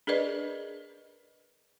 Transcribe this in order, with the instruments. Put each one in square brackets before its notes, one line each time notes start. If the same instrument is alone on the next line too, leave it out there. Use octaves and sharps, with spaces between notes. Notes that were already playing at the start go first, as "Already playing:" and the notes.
[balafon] D4 G#4 A#4 B4 D5 D#5